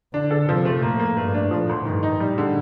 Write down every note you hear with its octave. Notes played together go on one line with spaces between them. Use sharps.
D3 D4
A4
C3 F3
A3
A2 A#3
A#3
G2 A3
D4
A2 F3
D2
G2 D#3
D#4
A2 G3
D3